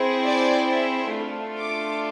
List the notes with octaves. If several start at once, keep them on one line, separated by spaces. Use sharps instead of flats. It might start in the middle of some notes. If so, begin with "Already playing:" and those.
Already playing: C4 E4 G#4
D5
E5
A3 D4 F4 A4
D6